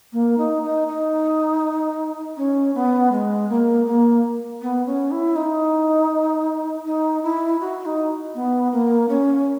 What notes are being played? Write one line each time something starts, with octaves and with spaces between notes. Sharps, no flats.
A#3
D#4
D#4
D#4
C#4
B3
G#3
A#3
A#3
B3
C#4
E4
D#4
D#4
E4
F#4
D#4
B3
A#3
C#4